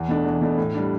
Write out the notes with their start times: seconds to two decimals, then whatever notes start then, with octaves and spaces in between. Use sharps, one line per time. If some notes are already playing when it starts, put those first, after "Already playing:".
Already playing: E2
0.08 B2 A3 D4
0.25 E2
0.41 B2 A3 D4
0.58 A2
0.75 G3 D4